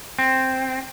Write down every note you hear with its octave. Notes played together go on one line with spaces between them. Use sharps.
C4